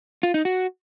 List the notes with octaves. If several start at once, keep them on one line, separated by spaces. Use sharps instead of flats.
F4
D#4
F#4